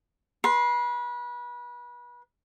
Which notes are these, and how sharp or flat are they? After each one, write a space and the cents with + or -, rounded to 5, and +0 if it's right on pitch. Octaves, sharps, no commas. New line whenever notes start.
B4 -30 C6 +0